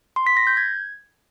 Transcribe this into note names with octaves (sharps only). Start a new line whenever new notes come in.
C6
B6
A#6
G6
G#6